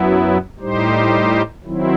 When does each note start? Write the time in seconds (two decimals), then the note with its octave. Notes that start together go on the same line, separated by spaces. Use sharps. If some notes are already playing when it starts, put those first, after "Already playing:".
Already playing: F#2 F#3 B3 E4
0.59 A2 G3 D#4 G4 C5
1.64 D#3 F#3 C4 E4